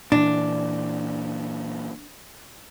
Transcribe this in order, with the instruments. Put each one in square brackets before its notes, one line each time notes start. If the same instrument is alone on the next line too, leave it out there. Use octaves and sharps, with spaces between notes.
[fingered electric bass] A#2 E3 [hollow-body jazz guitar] D4